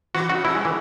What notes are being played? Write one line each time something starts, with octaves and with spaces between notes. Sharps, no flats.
E3 F#4
C#3 F#4
B2 E4
G#3
E3